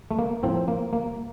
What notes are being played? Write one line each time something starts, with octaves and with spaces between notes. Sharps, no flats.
A3
A#3
A2 F3 C4
A#3
A#3